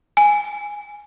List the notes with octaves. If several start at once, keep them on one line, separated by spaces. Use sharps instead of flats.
G#5